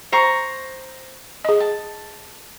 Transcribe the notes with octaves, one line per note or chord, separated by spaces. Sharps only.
C5 A#5 C#6
G#4 D#5
A5